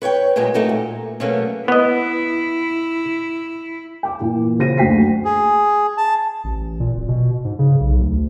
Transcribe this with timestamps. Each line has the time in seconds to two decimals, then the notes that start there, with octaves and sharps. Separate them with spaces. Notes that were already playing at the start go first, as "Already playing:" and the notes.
0.02 B4 C#5 F#5 G5
0.36 A#2 F#3 G#3 B3 G4
0.54 A3 D#4 F#4 G4 A#4
0.69 A#2
1.20 B2 F#3 G3 A3 A#3 C#4
1.68 B3 E4 D#5
4.03 G5 D6
4.20 A#2 E3
4.58 C#3 F#4 C5 A#6 D#7
4.77 F#1 D2 F#4 G5 B6 C7
5.25 G#4
5.97 A5
6.44 A1
6.80 A#2
6.95 D1
7.08 B2
7.45 G#2
7.59 C#3
7.80 B1
8.01 D2